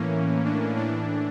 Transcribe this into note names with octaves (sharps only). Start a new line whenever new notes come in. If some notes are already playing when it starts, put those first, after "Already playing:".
Already playing: A2 E3 A#3 C#4
D4
A2 E3 D4